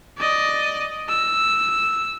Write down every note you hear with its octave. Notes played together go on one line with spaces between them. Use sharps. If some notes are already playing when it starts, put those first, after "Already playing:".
D5 D#5
E6